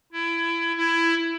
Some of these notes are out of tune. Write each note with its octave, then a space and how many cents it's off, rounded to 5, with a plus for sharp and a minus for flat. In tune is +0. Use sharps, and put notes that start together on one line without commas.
E4 +25
E4 +15